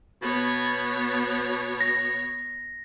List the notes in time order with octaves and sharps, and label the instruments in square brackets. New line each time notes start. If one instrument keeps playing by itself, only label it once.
[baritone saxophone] B2 [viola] B3 C#5
[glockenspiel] A#6